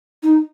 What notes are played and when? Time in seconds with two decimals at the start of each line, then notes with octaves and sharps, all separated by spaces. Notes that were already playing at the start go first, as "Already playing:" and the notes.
0.23 D#4